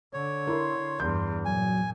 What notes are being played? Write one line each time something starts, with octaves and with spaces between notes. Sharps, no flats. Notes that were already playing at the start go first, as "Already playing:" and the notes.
D3 C#5
E4 A#4 C6
E2 G2 G6
A#2 F#3 G#5